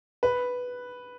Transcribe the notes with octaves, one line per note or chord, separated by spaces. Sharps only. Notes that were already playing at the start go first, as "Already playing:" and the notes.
B4